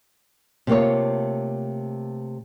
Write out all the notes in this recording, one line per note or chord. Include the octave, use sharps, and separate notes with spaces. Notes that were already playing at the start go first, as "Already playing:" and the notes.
C3 A3 A#3 F4 C#5